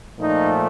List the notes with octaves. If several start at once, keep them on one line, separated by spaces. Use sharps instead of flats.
A#2 F3 A3 D#4